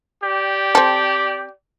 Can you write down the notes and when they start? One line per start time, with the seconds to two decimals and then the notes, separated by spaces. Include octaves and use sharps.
0.23 G4 D5 G5
0.75 C4 A4